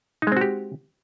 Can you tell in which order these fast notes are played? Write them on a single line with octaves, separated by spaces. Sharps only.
D#4 G#3 C4 F#4 G4